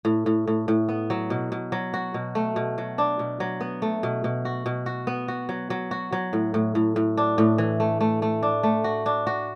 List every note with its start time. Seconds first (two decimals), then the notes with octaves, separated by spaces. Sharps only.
0.05 A2
0.26 A2
0.47 A2
0.68 A2
0.89 B3
1.10 F#3
1.30 B2
1.52 B2
1.72 F#3
1.94 F#4
2.14 B2
2.35 A3
2.56 B2
2.78 F#3
2.98 D4
3.19 B2
3.40 F#3
3.61 B3
3.82 A3
4.03 B2
4.24 B2
4.45 F#4
4.66 B2
4.86 F#4
5.07 B3
5.28 F#4
5.49 F#3
5.70 F#3
5.91 F#4
6.12 F#3
6.33 A2
6.54 A2
6.75 A2
6.96 A2
7.17 D4
7.38 A2
7.58 E3
7.80 A3
8.01 A3
8.22 A3
8.43 D4
8.63 A3
8.84 F#4
9.06 D4
9.27 F#4